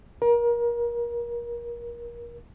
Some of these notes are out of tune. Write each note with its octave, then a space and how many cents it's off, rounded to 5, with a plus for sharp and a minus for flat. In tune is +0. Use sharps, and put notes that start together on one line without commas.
A#4 +30